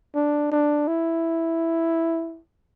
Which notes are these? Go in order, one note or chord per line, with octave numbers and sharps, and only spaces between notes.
D4
D4
E4